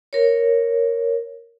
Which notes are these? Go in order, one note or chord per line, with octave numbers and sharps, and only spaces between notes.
A#4 C#5